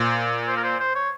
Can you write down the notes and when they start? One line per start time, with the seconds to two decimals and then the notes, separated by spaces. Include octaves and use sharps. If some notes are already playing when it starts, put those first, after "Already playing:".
Already playing: A#2 C5
0.47 C5
0.57 A#4
0.64 C5
0.80 C5
0.95 C#5